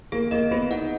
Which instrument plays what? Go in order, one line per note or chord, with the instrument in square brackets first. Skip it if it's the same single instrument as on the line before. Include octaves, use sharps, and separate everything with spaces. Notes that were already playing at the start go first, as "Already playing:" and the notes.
[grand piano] A#3 [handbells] G#4
[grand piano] A#3 [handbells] D#5
[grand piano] B3 [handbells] G#4
[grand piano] D#4 [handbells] F#5